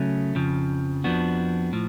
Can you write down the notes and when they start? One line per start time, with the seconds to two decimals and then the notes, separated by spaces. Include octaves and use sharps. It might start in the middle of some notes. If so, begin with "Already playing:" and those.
Already playing: C#3 F#3 A3 C#4
0.35 F2 C#3 F3
1.04 F2 F3 B3 D4 F#4
1.73 A2 F3